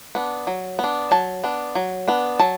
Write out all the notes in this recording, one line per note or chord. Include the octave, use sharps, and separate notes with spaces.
B3 D4
F#3
B3
D4
F#3 A5
B3 D4
F#3
B3 D4
F#3 A5